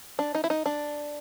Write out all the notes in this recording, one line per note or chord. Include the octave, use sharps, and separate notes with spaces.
D4
D#4
E4
D#4
D4